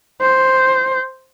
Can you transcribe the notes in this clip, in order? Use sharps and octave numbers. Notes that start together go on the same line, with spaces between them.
C5